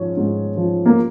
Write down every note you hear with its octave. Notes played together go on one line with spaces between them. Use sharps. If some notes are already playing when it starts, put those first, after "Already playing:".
Already playing: G#2 F3 C#4
G#2
F3
A#3